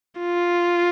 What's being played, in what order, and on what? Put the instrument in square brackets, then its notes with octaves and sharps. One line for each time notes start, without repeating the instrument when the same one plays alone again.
[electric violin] F4